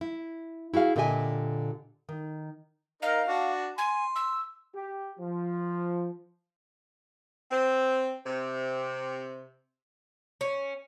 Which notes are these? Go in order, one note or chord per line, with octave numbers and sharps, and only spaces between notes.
E4
E4 F#4 G#4 F5
A#2 D3 G4 D#5 E5 G#5
D#3
D#4 A#4 F5
D4 F#4
G#5 C6
E6
G4
F3
C4
C3
C#4